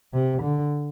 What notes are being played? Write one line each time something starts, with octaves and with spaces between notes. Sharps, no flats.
C3
D3